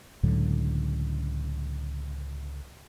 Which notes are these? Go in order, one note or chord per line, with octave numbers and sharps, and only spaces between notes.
C#2 A2 D3 F#3